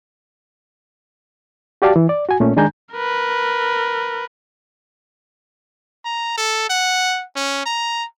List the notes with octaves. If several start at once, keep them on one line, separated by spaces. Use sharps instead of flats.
F#4 G4 D5 F5 A5
E3
D5
F#4 G#5
A#2 A3 C#4
D#3 G#3 D4 G#5 A#5 G6
A#4 B4
A#5
A4
F#5
C#4
A#5